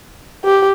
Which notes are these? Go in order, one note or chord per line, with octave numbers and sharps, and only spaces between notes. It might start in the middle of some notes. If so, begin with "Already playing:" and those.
G4